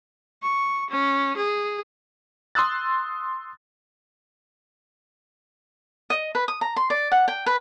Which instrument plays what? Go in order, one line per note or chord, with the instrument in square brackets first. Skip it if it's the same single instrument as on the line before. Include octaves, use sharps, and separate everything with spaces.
[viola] C#6
C#4
G#4
[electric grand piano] C6 D#6 E6 F#6 A6
[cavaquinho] D#5
B4
D#6
A#5
C6
D5
F#5
G5
B4